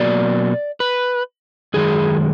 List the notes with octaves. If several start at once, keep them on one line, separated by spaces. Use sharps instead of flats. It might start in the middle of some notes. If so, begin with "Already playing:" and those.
Already playing: B2 F#3 A#3 D5
B4
F#2 D#3 G#3 G#4